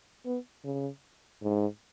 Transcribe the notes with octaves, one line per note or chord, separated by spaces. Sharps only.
B3
C#3
G#2